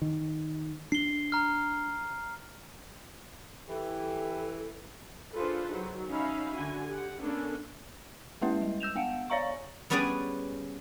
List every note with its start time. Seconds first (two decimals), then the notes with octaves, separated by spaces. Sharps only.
0.02 D#3
0.92 D4 C7 G7
1.32 A#5 F6
3.69 E3 G4 A4
5.34 D4 F4 G#4 A4 B4 C5
5.70 D#3 F#3
6.09 C#4 D#4 E5 F5 B5
6.54 D3 F#4 G#5
6.89 G4 F#5
7.21 A#3 B3 C#4 D4 A4
8.42 G#3 A#3 C#4 E4 B4 E5
8.62 G3
8.80 E6 G6 E7 F7
8.96 B3 F5 F#5
9.30 C#5 D5 F5 A#5 C#6
9.90 G3 B3 C#4 G#4 B4 D5